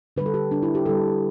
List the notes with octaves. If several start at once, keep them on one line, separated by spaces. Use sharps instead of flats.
D3 G3 B4
A4
G4
D3 G3 D4
E4
G4
D3 G3 A4